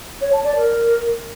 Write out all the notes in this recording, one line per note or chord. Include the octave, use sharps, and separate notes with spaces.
C#5
A5
D5
A#4